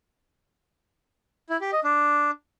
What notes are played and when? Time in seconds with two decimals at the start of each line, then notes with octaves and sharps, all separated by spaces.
1.50 E4
1.61 G4
1.73 D#5
1.84 D4